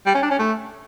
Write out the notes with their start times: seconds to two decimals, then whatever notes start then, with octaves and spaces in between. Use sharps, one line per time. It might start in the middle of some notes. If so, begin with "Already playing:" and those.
0.06 G3
0.15 C#4
0.23 D4
0.31 C#4
0.39 A3